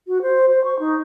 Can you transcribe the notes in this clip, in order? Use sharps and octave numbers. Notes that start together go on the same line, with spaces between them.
F#4
C5
C5
C#6
D#4